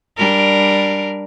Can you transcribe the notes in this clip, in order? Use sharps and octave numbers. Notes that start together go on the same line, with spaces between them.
G3 D4 A#4